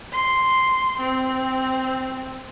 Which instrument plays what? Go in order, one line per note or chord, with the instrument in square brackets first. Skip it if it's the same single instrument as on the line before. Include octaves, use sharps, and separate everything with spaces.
[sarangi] C6
C4